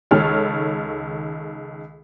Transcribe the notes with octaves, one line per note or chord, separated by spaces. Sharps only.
C#2 D#3 A4 C#5 F6